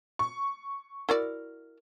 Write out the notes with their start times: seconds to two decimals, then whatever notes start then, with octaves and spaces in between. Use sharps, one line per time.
0.19 C#6
1.09 E4 F#4 A#4 D5